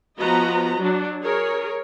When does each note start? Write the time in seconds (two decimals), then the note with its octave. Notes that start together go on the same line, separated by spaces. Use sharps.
0.20 F3 B3 F#4 B4 D#5 A#5
0.79 F#3 D4
1.23 G#4 A#4 C#5